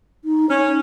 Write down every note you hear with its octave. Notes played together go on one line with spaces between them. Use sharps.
D#4
C#4 C#5